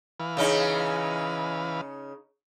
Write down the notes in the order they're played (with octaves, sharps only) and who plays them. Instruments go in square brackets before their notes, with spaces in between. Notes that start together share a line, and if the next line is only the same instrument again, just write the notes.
[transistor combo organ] E3 B4 F5
[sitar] C#3 C#4 D#4